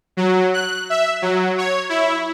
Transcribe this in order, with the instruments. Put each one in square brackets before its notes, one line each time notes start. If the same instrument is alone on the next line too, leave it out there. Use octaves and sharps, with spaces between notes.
[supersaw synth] F#3
F#6
E5
F#3
C#5
E4